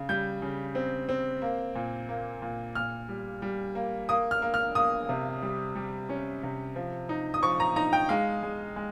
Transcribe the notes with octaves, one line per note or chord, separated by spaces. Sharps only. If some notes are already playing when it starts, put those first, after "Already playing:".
Already playing: C#3
G3 G6
C#3
C4
C4
A#3
A#2
A#3
A#2
A#2 F6
G3
G3
A#3
A#3 D#6
F6
A#3
F6
A#3 D#6
C3
G3
G3
C#4
C3
F3
D#4
D#6
F3 C#6
A#5
D#4 A#5
G5
G#3 F5
G#3
G#3